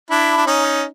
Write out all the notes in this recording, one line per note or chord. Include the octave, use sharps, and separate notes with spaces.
D4 E4
D4
C#4 D#4